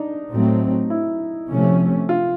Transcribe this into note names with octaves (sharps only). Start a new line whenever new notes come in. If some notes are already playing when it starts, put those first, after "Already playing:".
Already playing: D4 D#4
A2 F#3 A3 C4
E4
C3 F3 A3 C#4
F4